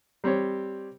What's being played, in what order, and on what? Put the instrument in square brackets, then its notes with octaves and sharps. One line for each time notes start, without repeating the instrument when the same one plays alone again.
[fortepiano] G3 C4 G4 C#5